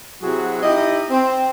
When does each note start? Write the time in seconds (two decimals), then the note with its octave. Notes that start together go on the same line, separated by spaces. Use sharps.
0.22 C3 F#3 C4 E4 F#4 G#4
0.63 D#4 E4 G4 D#5
1.11 C4